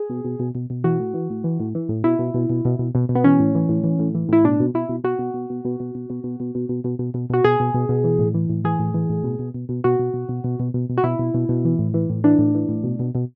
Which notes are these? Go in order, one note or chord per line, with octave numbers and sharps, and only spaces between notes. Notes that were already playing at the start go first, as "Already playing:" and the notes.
Already playing: G#4
B2
B2
B2
B2
B2
E3 F#4
A2
E3
A2
E3
A2
E3
A2
B2 E4
B2
B2
B2
B2
B2
B2
B2
B3
E3 C#4
A2
E3
A2
E3
A2
E3
A2 E4
B2 D4
B2
B2 E4
B2
B2 F#4
B2
B2
B2
B2
B2
B2
B2
B2
B2
B2
B2
B2
B2
B2
B2 F#4
B2 G#4
B2
B2
B2
E3
A2
E3
A2
E3 G#4
A2
E3
A2
B2
B2
B2
B2
B2 F#4
B2
B2
B2
B2
B2
B2
B2
F#4
B2 E4
B2
B2
B2
E3
A2
E3
A2
E3 D4
A2
E3
A2
B2
B2
B2